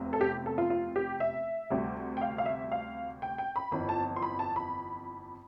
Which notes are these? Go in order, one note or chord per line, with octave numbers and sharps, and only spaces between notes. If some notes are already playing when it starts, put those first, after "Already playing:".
Already playing: F1 E2 C3
A4
G4
A4
F4
F4
G4
E5
D2 C3 G3
G5
F5
F5
E5
F5
G5
G5
B5
G1 F2 E3 B5
A5
C6
B5
A5
B5